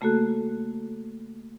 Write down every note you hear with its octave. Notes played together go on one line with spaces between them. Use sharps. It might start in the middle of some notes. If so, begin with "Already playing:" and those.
C#3 A3 A#3 F#4 A4 F#6